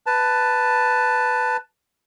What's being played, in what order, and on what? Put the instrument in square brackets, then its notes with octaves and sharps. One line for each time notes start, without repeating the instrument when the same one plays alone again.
[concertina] B4 A5